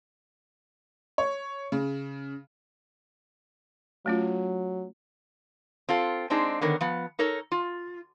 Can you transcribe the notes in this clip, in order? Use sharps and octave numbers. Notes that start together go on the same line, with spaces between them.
C#5
C#3
F#3 A3 C#4 F4
C4 F4 A4
G#3 C4 D4 D#4 G#4
D3 D#3 B3 A#4 C#5
F3 B3
D#4 A4 A#4 C#5
F4